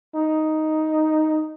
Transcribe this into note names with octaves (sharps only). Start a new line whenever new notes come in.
D#4